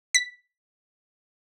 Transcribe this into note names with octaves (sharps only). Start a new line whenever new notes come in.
B6